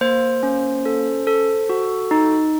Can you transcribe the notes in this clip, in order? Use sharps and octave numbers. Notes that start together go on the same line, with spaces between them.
A#3 C5
C#4
A4
A4
F#4
D#4